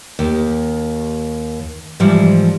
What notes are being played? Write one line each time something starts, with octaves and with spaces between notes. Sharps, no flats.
D#2
G#2 E3 F3 G3